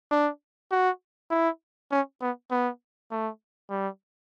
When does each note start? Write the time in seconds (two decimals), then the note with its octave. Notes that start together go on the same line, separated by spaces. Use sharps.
0.11 D4
0.71 F#4
1.31 E4
1.91 C#4
2.22 B3
2.51 B3
3.11 A3
3.70 G3